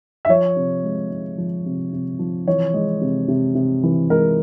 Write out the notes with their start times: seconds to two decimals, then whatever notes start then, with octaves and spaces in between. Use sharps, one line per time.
0.25 E5
0.29 F3 C#5
0.56 C3
0.84 G#3
1.10 G#3
1.38 F3
1.66 C3
1.93 C3
2.19 F3
2.47 E3 C#5
2.74 G#3
3.01 C3
3.28 C3
3.55 C3
3.83 E3
4.10 G#3 A#4